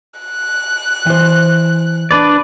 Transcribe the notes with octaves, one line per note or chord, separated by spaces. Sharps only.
F#6
E3 C5
D4 B4 D5